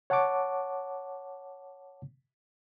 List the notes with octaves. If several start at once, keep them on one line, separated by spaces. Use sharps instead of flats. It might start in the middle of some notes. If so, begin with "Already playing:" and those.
C#5 F#5 A5 C#6 D6